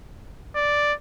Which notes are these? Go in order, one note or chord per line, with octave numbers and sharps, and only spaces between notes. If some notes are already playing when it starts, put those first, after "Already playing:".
D5